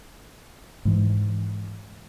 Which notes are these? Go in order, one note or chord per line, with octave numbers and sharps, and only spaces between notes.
G#2 E3